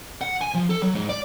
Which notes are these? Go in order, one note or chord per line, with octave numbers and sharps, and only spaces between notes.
F#5
G#5
F3
A4
F#3
G#2
D5